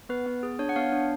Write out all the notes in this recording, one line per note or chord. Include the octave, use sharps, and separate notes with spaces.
B3 B4
B3
G#4
D4 C#5
F#5
B3 C#5 F5
D4